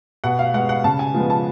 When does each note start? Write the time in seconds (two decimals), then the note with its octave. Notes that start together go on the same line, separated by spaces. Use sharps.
0.24 B2 F#5
0.39 F5
0.54 G#3 B3 F#5
0.69 F#5
0.84 C#3 A5
0.99 G#5
1.14 F3 G#3 B3
1.30 A5